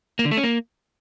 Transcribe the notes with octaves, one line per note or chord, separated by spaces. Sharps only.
A#3
D3
A3
C#4
A#3